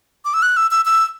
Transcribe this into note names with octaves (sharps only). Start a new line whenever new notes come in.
D6
E6
F#6
E6
E6
E6